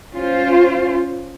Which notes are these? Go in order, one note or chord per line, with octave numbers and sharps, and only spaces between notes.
C#4 F4 C5